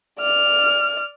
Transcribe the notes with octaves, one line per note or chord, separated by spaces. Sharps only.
D5 F6